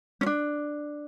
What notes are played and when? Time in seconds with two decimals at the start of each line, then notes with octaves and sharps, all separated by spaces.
0.21 C#4
0.26 D4